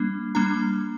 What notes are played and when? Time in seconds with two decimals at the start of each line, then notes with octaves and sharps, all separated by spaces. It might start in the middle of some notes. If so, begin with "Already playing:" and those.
Already playing: G3 A#3 D4
0.35 G3 A#3 D4 A#5